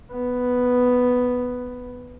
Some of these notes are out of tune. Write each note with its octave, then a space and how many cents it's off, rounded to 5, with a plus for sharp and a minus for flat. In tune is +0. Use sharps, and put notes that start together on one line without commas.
B3 +5